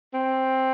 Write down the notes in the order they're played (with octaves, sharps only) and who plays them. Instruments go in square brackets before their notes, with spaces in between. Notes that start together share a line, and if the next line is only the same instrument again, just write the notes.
[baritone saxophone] C4